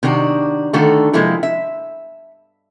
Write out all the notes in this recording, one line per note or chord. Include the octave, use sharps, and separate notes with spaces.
C3 D#3 D4 F#4
D3 D#3 A3 F4 F#4 A4
C3 F3 G#3 A#3 E4 A4
E5